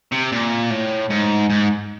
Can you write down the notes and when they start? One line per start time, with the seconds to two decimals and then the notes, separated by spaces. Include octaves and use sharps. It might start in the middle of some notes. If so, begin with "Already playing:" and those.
0.12 C3
0.32 A#2
0.70 A2
1.10 G#2
1.50 G#2